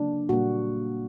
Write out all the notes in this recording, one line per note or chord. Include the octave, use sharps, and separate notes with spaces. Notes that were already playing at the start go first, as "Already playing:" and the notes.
Already playing: C#3 F#3 A#3 D4
A#2 G3 A#3 F#4